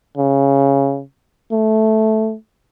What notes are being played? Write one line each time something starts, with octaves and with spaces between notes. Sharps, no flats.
C#3
A3